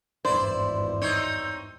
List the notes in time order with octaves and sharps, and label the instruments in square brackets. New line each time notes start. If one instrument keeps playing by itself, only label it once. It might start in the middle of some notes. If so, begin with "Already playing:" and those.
[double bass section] G#1 E2 G2 [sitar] E4 D5 [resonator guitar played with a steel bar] C5
[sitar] C4 D#4 C#5